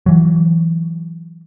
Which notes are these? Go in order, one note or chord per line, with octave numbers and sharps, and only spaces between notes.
E3 F#3